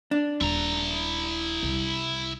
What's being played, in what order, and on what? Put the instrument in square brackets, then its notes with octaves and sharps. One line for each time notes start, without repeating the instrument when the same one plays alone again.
[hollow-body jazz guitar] D4
[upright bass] D#1 [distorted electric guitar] E4 A#5
[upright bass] C2